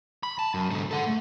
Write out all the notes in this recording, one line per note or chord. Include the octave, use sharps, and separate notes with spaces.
B5
A5
F#2
G#2 D3
A4 F#5
A3